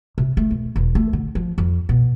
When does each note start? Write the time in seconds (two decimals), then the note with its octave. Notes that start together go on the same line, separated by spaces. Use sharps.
0.18 C3
0.37 A3
0.51 E1
0.76 E1
0.95 A3
1.13 D3
1.35 F3
1.58 F2
1.89 B2